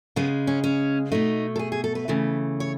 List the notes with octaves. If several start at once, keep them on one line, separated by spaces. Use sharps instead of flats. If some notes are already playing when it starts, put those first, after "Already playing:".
C#3 G#3 B3
C#4
C#4
B2 A3 D#4
A4
G#4
G#4
A4
B4
C#3 E3 A3
C#5